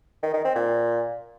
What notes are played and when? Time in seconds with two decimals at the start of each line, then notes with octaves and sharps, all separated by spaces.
0.23 D#3
0.34 D#3
0.45 C4
0.55 A#2